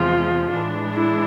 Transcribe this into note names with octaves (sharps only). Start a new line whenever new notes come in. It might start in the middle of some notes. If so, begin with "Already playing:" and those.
Already playing: E2 C3 F3 G#3 F4
A2 E3 G#3 D4
E4